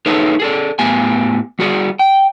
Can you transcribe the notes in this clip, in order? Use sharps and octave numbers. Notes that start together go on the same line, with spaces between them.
D#4 G#4 A4 B4 C#5 E5
G#4 A4 D5
A2 B3 G4 G#5
G3 F#4 G#4 D5
G5